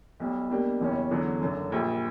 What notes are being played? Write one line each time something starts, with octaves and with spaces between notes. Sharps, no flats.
B1 B2 G3
B2 G3 A#3 D4 G4
F#1 E2 B2 G3 C#4
E2 D3 F#3 C#4
F#1 F#2 D3
A#1 A#2 G3